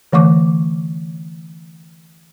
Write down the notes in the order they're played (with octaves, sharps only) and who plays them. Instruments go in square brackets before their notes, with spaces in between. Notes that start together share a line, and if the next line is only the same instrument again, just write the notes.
[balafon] D3 E3 A3 C#6 D6